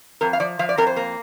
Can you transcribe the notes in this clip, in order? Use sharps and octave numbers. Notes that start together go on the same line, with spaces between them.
F2 A#4
F5
F3 D5
F3 F5
D5
F2 A#4
C5
A#3